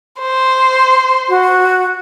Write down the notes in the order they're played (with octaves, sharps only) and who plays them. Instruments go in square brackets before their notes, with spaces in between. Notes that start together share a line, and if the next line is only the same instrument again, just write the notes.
[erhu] C5
[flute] F#4